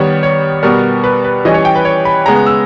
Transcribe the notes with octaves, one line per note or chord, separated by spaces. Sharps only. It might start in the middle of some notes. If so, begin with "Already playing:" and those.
Already playing: D#3 G3 B3 C#5
C#5
B2 G3 B3 A#4
B4
B4
E3 G3 C#4 D#5
C#5
G5
B4
C#5
B5
C#3 G#3 B3 A#5
E6